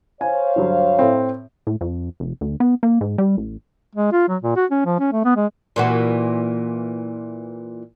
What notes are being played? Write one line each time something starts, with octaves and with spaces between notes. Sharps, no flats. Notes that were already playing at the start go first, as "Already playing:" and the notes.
C5 C#5 F5 G#5
D2 G2 F#3
A2 C4
A2
F2
F1
D2
B3
A#3
G#2
G3
A1
G#3
F4
F#3
A#2
F#4
C#4
F3
C#4
A3
B3
G#3
A#2 E3 F#4